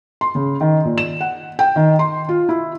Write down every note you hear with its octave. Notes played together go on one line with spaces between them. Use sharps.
C6
C#3
D#3
A#2
E7
F#5
G5
D#3
C6
F4
E4